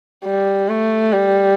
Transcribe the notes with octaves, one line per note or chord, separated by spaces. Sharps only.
G3
A3
G3